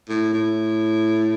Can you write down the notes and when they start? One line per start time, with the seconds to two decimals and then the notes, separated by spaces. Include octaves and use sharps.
0.09 A2
0.33 A2